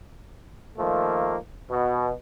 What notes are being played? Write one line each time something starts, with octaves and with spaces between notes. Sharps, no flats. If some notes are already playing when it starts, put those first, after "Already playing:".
D#3 F3 A3 A#3
B2